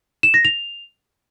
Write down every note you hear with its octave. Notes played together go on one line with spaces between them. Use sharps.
E7
A#6
F7